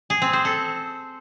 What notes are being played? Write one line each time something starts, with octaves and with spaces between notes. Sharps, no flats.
G#4
C4
C5
A4